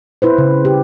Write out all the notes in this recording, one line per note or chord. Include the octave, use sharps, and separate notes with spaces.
E4 B4 C5
C#3
G4